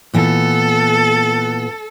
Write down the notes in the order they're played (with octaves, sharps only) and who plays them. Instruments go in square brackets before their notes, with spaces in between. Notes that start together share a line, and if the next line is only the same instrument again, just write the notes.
[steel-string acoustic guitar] A#2 E3 B3 [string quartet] A4